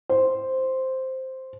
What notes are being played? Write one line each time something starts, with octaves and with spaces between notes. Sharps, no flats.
C5